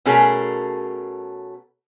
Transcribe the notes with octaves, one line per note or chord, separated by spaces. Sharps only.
B2 A3 C#4 G#4 A#4